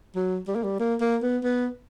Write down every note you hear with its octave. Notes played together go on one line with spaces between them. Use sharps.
F#3
G3
A#3
G3
A#3
A#3
B3
B3